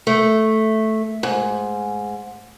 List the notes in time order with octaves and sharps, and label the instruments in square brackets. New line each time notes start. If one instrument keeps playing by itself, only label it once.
[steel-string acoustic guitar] A3
G#2